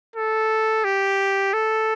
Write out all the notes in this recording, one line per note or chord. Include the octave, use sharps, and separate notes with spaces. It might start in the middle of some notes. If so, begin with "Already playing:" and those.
A4
G4
A4